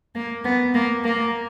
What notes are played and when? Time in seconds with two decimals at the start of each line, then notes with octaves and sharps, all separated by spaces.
0.15 A#3
0.44 B3
0.74 A#3
1.04 A#3